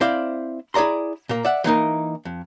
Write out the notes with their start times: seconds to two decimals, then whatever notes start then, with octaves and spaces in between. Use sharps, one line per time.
0.01 C4 E4 C5 D5 F5
0.74 E4 G#4 D5 A#5 C6
1.29 A#2 A#3
1.45 D5 E5 F#5
1.64 E3 A#3 D#4 A#4
2.25 F2